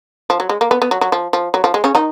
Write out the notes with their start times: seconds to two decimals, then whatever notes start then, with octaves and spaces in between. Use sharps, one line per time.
0.30 F3
0.40 F#3
0.49 G#3
0.61 A#3
0.71 B3
0.82 B3
0.91 F#3
1.01 F#3
1.12 F3
1.33 F3
1.54 F#3
1.64 F3
1.74 G#3
1.84 C#3 C#4
1.95 D#3 D#4